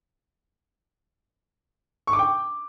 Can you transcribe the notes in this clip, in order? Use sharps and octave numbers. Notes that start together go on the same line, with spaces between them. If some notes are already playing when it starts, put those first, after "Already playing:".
C#6
D6
G5